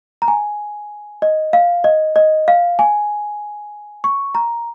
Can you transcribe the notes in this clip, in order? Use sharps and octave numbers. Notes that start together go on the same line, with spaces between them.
A#5
G#5
D#5
F5
D#5
D#5
F5
G#5
C#6
A#5